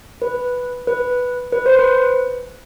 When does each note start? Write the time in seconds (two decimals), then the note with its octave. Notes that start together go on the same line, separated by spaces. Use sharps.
0.22 B4
0.87 B4
1.52 B4
1.66 C5
1.79 B4